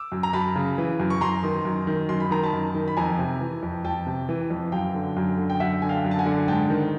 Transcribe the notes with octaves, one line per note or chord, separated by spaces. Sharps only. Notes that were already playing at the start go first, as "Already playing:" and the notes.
Already playing: D6 E6
F#2
A#5
F#2 A5 B5
C#3
E3
F#2
C#6
F#2 A#5 C6
D#3
F#2
D#3
F#2 C6
B5
D#3 A#5
A5 B5
F#2
D#3
B5
F2 G#5 A#5
C3
E3
F2
F2 G5 A5
C3
E3
F2
F#2 F5 G5
D3
F#2
D3
G5
F#2 E5 F#5
D3 G#5
F5 G5
F#2
A5
F#5 G#5
D3
G#2 G5 A5
D#3